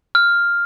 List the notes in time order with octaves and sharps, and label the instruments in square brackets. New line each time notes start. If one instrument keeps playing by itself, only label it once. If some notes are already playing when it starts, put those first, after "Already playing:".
[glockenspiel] F6